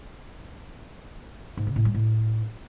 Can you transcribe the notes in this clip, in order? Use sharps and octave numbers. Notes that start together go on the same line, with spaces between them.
G#2
C#3
A2
G3
A2